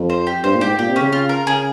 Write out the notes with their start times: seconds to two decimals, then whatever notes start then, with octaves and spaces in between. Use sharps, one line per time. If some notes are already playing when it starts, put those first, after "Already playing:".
Already playing: F2
0.10 C5
0.27 G4
0.44 G2 C5
0.55 A#2
0.61 G#2 G4
0.79 A#2 G4
0.90 C3
0.96 C#4
1.01 C#3
1.12 F4
1.29 A#4
1.47 C#3 G#4